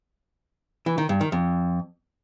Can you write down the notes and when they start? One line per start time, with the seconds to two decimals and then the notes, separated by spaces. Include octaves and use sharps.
0.86 E3
0.98 D#3
1.09 G2
1.21 D#3
1.32 F2